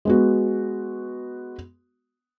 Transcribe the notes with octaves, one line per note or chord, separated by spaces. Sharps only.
G#3 B3 F#4